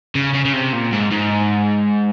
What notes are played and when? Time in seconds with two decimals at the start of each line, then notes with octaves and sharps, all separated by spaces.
0.15 C#3
0.34 C#3
0.45 C#3
0.53 C3
0.73 A#2
0.92 G#2
1.11 G#2